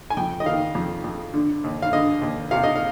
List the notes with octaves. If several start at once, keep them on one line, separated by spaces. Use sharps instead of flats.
G#5
F2 G5
D#5
D#3 F5
F2
F2
D3
D#2
F5
D3 D#5
D#2
C3 F5
D#5
F5